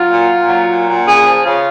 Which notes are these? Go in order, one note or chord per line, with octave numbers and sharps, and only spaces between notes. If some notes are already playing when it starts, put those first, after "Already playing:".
Already playing: F#3 F4
A#2
A#2
F#3
A#2
A#2
C#3 G#4
F3
C#3 F4